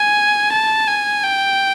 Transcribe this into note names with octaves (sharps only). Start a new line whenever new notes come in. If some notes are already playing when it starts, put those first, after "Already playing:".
Already playing: G#5
A5
G#5
G5